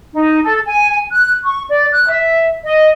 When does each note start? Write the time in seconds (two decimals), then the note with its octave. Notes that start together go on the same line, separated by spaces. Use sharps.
0.13 D#4
0.43 A4
0.66 G#5
1.11 F#6
1.44 C#6
1.69 D5
1.92 F#6
2.09 E5
2.64 D#5